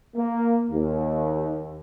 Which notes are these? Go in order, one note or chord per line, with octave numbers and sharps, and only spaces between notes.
A#3
D#2